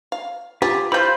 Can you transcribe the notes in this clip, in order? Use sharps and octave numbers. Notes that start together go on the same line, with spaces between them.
F5
F4 G4 G#4
E3 F4 C5 B5 G6